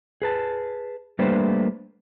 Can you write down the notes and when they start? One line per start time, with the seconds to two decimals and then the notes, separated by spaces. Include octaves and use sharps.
0.22 G#4 B4 A5
1.19 G3 A3 A#3 D4 B4 C5